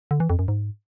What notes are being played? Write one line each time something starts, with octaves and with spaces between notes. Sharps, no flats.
D3
E3
F2
F#2
G#2